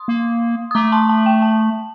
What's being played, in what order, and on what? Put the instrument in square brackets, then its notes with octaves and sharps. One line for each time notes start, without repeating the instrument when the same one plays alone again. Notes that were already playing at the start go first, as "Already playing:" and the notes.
Already playing: [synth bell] C6 D#6
[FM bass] A#3
[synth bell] D#6
[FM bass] A3 [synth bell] A#5 D6
[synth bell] A5 C6
A5
G5
A5